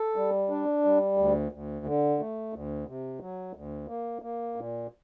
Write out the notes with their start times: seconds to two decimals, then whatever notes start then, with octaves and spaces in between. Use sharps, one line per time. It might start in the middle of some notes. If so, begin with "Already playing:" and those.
Already playing: A4
0.16 G3
0.50 D4
0.84 G3
1.17 D2
1.52 D2
1.86 D3
2.19 A3
2.53 D2
2.87 C3
3.20 F#3
3.55 D2
3.88 A#3
4.22 A#3
4.56 A#2